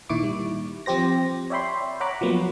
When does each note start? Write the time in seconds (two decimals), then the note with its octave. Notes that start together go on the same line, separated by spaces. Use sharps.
0.09 A#2 D#3 E4 C#6 D6
0.23 G3
0.86 F3 C4 G4 C5 A#6
1.50 C#5 D5 E5 G5 B5 C6
2.00 C#5 F#5 A#5 B5 D6 F#6
2.21 F3 F#3 A#3 B3